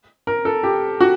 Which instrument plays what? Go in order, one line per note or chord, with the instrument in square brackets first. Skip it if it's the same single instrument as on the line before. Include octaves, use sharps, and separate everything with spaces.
[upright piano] A#4
A4
G4
F#4